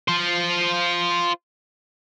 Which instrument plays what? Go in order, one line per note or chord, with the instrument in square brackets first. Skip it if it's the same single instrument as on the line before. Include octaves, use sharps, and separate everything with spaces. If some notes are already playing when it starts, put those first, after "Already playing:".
[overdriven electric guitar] F4 C5